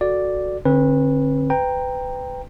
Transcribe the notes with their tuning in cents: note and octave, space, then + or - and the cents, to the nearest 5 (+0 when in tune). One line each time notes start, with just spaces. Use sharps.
F#4 +0 A4 +0 D5 +0
D3 +0 C4 +40 B4 -20
B4 +25 G5 +10 A#5 +0